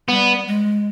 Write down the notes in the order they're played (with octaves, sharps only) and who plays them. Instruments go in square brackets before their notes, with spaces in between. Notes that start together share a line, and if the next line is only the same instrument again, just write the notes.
[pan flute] G3 [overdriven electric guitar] B3
[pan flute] G#3